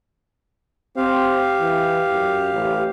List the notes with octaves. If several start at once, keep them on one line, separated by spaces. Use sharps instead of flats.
C4 G4 F5
E3
F#2
A1